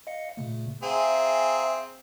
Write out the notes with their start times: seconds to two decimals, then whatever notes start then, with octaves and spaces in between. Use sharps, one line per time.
0.07 D#5 F5 C#7
0.37 A#2 C#3 A3
0.83 C4 G#4 E5 F5 G#5 A#5